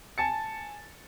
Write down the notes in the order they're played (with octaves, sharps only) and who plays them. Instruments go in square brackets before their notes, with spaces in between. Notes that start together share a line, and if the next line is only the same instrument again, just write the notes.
[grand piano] G#5 A5 A6 C#7